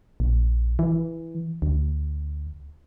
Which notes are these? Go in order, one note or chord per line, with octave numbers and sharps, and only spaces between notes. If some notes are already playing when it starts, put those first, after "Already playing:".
A#1
E3
D2